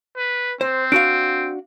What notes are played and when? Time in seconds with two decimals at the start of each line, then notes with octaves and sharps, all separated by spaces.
0.17 B4
0.61 C4 C5
0.92 D4 F#4 F5 D7